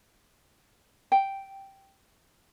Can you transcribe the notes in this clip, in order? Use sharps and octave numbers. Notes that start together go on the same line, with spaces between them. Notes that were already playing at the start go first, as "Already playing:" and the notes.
G5